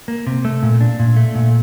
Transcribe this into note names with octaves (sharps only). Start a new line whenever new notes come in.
A#3
C3
A3
A#2
D4
A#2
A3
A#2